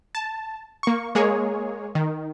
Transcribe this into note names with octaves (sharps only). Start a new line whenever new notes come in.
A5
A#3 C#6
G#3 A#3 G#4 C#5
D#3